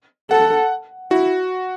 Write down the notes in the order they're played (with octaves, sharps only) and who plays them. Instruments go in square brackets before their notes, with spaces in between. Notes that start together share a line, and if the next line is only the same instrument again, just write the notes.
[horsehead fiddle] A4 [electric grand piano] F#5
[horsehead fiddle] E4 [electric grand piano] F#4